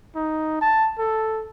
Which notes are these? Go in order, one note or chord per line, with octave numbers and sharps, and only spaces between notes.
D#4
A5
A4